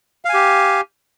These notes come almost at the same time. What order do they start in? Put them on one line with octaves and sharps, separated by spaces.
F5 G#5 G4